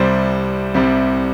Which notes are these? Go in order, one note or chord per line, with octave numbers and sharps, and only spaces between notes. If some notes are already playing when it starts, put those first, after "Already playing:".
Already playing: C2 C3 G3 C5
C2 C3 G3